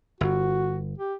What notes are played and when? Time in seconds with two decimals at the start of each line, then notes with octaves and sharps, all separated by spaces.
0.21 G1 F#4
0.98 G4